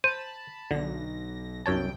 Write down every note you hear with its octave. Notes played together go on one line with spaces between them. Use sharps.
C5 A5 B5 D#7
B1 D3 A#6
C2 F#2 C#5 G5 A5